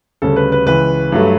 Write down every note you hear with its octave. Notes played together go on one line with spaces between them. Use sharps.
D2 C#3 G3 A4
B4
B4
C#2 C#3 E3 B4
G2 F#3 A3